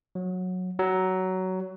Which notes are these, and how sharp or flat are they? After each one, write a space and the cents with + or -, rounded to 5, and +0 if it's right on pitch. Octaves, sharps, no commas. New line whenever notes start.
F#3 -15
F#3 +15